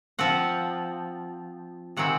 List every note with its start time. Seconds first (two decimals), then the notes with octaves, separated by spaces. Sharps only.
0.19 F3 C4 F#5
1.97 C3 D#3 G#3 C4 F#5